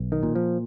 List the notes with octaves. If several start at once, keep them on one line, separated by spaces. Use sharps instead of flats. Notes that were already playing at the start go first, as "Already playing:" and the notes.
Already playing: B1
D#3
A#2
F3